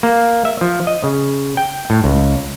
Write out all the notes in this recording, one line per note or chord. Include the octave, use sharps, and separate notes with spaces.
A#3
E5
F3
D#5
C#3
G5
A2
C#2